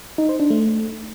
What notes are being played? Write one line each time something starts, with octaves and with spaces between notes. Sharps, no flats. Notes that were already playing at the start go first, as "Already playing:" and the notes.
D#4
C5
D4
A3